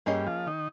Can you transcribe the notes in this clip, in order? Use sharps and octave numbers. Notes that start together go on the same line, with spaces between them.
G2 G3 A#3 C#4 G#4 D#5
F3 F4
D#3 D#4